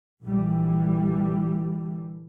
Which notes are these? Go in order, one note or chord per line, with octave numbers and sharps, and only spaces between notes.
A#1 D3 E3 G3